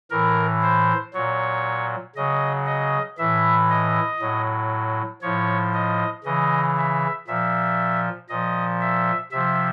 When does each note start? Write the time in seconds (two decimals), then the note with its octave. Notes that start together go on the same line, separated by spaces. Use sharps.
0.11 A2 E3 A#4
0.62 C5
1.14 A#2 F#3 C#5
2.16 C#3 F#3 D#5
2.66 D#5
3.18 A2 E3 E5
3.70 D#5
4.20 A2 F#3
5.22 A2 F3 C#5
5.74 D#5
6.24 C#3 E3 D#5
6.77 E5
7.27 A#2 F3 E5
8.29 A#2 F3 D#5
8.81 E5
9.31 C3 F3 E5